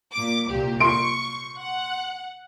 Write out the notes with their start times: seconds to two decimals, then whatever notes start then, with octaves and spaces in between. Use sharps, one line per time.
0.12 A#2 D6
0.49 C2 A#2 G4
0.80 C6 C#6 D7
1.58 F#5